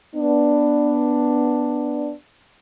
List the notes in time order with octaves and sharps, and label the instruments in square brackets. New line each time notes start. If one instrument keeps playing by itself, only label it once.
[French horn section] B3 D4